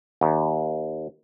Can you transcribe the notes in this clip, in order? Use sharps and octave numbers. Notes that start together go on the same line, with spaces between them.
D#2